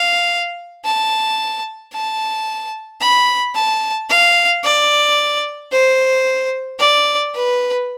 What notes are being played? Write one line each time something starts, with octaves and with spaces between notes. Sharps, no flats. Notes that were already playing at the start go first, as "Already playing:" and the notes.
Already playing: F5
A5
A5
B5
A5
F5
D5
C5
D5
B4